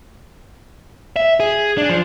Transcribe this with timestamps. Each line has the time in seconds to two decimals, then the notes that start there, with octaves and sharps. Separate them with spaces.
1.16 E5
1.40 G#4
1.78 D4
1.89 F3